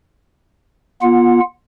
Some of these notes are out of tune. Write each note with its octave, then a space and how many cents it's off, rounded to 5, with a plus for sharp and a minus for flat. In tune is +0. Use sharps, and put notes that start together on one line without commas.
B3 -35 F4 +0 F#5 -15